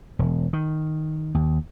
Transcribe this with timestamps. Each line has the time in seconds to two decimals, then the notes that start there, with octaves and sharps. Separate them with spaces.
0.19 E1
0.53 D#3
1.35 D#2